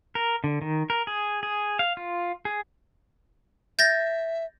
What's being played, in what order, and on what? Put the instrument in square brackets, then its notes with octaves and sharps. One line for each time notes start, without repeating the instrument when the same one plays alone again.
[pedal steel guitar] A#4
D3
D#3
A#4
G#4
G#4
F5
F4
G#4
[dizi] E5 [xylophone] G6 A6 A#6